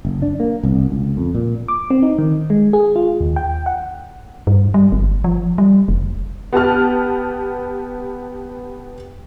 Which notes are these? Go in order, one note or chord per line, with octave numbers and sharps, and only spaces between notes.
F#1
D4
A#3
C2
C#2
F2
A#2
D6
C4
D#4
D#3
G#3
G#4
F4
D#2
G5
F#5
G2
G3
G1
F3
G3
F1
B3 G4 A5 F6